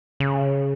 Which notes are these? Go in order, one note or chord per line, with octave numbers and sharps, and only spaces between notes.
C#3